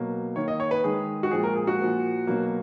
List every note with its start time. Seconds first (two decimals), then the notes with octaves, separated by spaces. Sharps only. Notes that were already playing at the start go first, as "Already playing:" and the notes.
Already playing: B2 F#3 A#3
0.36 D#3 A#3 C#5
0.48 D#5
0.60 C#5
0.71 B4
0.84 D#3 G#3 G#4
1.23 F#4
1.31 A#2 F3 G#3 G#4
1.43 A#4
1.56 G#4
1.67 F#4
1.79 A#2 F3 A#3
2.27 B2 F#3 A#3